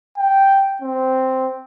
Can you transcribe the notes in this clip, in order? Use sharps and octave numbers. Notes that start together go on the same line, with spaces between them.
G5
C4